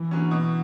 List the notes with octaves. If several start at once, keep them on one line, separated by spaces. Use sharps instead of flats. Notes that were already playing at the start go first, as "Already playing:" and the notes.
Already playing: E3
D3 F#3 C#4
B2